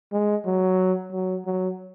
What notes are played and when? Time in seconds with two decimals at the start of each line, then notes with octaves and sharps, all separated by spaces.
0.12 G#3
0.46 F#3
1.13 F#3
1.46 F#3